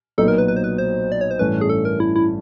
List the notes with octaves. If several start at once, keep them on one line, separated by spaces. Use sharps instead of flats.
B1 A#2 F#3 B3 D#4 A4
A#4
B4
B4
C5
B4
C5
D5
C#5
C5
A1 G2 E3 A3 C#4 B4
G#4
A4
A#4
E4
E4